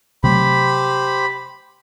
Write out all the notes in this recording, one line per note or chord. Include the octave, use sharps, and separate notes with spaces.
C3 F#3 A3 G4 C5 B5